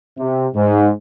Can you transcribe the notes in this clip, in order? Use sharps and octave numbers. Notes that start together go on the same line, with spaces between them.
C3
G#2